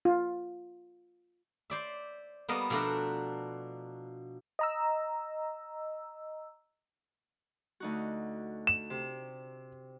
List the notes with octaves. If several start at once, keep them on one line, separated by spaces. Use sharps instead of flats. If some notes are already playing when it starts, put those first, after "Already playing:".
F4
C5 D5 E5
G3 A#3 B3 A#4 D#5
B2 F3 A3 D4 F#4 A#4
D#5 A#5 E6
D2 D#4 F#4
E7
C3